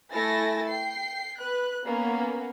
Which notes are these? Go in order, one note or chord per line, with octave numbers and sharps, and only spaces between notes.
A3 E4 A4 G#5 A6 A#6
G5 C7
B4 F#6
A#3 B3 C#4